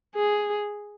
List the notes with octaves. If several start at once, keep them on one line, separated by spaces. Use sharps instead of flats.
G#4